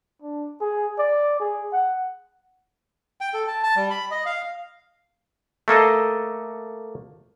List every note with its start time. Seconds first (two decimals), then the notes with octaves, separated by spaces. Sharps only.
0.22 D4
0.61 G#4
0.98 D5
1.40 G#4
1.72 F#5
3.21 G5
3.34 A4
3.48 A5
3.63 A5
3.76 G3
3.90 B5
4.11 D#5
4.26 F5
5.68 A3 A#3 A4 D#5